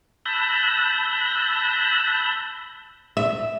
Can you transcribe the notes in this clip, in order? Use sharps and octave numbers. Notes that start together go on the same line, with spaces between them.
A5 B5 E6 F#6 G6 A#6
E5